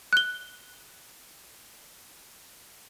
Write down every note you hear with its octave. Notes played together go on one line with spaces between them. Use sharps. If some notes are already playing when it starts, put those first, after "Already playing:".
F#6 G7